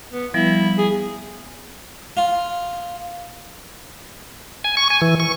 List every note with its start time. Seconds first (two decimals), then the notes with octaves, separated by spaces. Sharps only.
0.13 B3
0.34 F3 G3 B3 E4
0.78 G#4
2.17 F4
4.64 G#5
4.77 C#6
4.90 G#5
5.02 E3
5.20 C#6